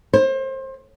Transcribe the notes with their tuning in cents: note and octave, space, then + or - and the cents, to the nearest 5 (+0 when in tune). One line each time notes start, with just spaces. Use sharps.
C5 +30